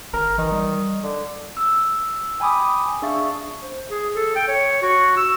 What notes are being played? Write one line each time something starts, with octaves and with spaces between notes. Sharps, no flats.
G#1 A#4
D#3 E3
G3
D3
E6
G5 G#5 B5 D6 D#6
D4 G#4 E5 F5 C#6 A6
C5
G#4
A4
G5
C#5
F#4
E6